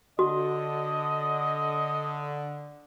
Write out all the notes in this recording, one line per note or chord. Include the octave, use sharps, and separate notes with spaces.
D3 F#4 D#5